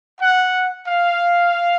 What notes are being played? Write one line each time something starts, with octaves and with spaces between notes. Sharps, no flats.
F#5
F5